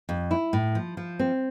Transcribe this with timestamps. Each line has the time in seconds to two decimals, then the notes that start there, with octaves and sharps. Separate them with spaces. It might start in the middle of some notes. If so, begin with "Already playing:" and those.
0.09 F2
0.31 E4
0.53 A2
0.75 F3
0.97 F3
1.19 C4